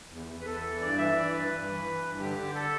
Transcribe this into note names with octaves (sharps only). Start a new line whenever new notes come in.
E2
E2
B4
E2 A4
E3
G2 D5
E3 E5
E3 D5
G2 B4
G2
E3
E3
G2
D3 G4
D3
A4